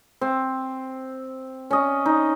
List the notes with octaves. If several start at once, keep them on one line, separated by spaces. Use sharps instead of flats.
C4
C#4 D#5
D#4